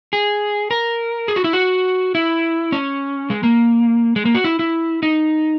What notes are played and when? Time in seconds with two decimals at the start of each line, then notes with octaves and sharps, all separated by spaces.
0.13 G#4
0.71 A#4
1.28 G#4
1.36 F#4
1.44 E4
1.53 F#4
2.15 E4
2.72 C#4
3.30 G#3
3.43 A#3
4.16 G#3
4.25 A#3
4.35 F#4
4.44 E4
4.59 E4
5.03 D#4